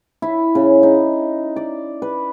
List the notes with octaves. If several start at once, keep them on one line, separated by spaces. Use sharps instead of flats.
E4
C#3
D#4
D5
B4